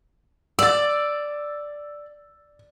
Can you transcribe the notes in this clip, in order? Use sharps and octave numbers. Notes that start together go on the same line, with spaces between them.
D5 E6 A6